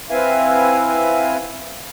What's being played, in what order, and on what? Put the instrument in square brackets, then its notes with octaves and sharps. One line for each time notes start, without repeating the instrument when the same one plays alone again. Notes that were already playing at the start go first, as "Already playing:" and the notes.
[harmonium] C4 E4 B4 E5 F5 G#5